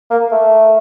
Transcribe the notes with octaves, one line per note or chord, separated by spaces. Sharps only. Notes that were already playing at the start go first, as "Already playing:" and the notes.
A#3
A3